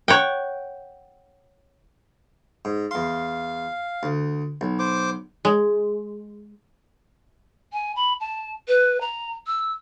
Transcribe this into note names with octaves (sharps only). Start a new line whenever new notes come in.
C#5 F#5 G5
G#2
E2 F5 C6
D2
B1
C5 D6
G#3
G#5
B5
A5
B4
A#5
E6